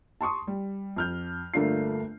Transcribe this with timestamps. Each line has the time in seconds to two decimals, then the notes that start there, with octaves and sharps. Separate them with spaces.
0.21 A5 C6 C#6 D#6
0.47 G3
0.96 F2 F6 G6
1.54 G1 A3 A#3 D4 F4 C7